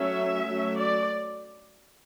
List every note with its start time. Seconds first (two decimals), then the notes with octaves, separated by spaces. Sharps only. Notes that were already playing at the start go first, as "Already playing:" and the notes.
Already playing: F#3 A3 C#4 E5
0.48 F#3 A3 C#4
0.77 D5